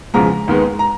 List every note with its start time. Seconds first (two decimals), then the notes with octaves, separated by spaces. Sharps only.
0.14 E2 C#3 F3 G#3 A#5
0.48 D#2 D#3 G#3 B3
0.79 A#5